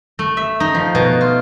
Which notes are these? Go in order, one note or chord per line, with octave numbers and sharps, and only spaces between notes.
A3
E5
D#4
F3
B2
F4